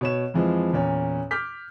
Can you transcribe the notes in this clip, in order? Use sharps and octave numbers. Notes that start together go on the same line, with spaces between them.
B2 C#5 E7
F2 E3 F3 G#3
E2 A#2 C#4
D6 F6 G6 B6